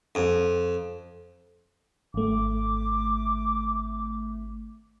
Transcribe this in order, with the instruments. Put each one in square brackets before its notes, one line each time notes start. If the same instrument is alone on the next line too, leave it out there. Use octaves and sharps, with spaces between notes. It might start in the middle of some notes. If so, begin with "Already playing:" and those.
[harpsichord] F2
[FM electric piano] G#1 A3 [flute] D6